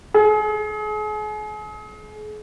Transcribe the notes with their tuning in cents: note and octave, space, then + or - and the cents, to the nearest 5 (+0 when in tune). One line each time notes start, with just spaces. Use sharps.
G#4 +35